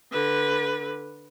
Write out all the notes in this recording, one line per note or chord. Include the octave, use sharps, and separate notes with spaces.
D3 B4